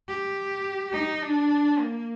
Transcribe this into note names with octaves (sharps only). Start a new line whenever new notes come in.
G4
D#4
D4
A#3